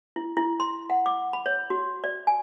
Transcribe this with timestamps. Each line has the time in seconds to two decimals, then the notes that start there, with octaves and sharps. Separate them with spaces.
0.16 E4
0.37 E4
0.60 C6
0.90 F#5
1.06 D6
1.33 B5
1.46 C#5
1.70 F#4
2.04 D5
2.27 G#5